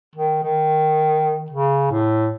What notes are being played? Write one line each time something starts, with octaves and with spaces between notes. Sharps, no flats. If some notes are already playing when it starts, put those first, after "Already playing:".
D#3
D#3
C#3
A2